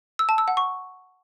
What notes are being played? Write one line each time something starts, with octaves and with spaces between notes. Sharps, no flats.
E6
A5
E6
F#5
C#6